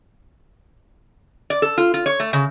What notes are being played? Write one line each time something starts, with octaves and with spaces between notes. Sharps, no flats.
D5
A4
F4
F4
C#5
A3
C#3